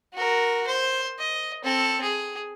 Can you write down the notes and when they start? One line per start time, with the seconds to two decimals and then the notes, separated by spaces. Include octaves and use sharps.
0.14 F#4 A#4
0.67 C5
1.19 D#5
1.64 C4 A4
2.02 G#4